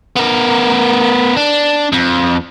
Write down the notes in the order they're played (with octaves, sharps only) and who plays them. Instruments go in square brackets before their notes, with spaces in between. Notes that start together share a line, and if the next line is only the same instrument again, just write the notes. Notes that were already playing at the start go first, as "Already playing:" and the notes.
[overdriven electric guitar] B3 A#4
D4
F2